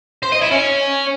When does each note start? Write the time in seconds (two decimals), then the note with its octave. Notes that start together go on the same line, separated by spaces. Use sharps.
0.23 C5
0.32 D#5
0.42 E4
0.51 C#4